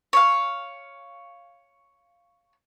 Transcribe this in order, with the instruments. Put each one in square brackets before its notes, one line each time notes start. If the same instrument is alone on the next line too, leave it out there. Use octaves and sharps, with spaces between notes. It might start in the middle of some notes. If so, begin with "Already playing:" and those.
[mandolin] C#5 F5